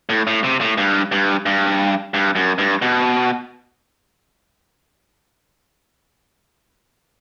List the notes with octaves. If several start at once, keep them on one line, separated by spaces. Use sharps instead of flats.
A2
A2
C3
A2
G2
G2
G2
G2
F#2
G2
B2